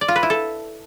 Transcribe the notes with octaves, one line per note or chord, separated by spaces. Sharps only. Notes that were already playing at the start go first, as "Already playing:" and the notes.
D5
F4
B4
E4
A4